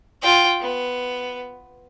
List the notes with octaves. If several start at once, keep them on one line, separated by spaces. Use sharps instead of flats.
F4 G5
B3